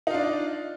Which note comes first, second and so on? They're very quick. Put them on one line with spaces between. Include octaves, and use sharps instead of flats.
D#4 F4 D4 D5